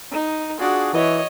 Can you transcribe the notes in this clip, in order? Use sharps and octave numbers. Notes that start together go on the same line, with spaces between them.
D#4
D4 F4 F#4 G#4
E3 C#5 D#5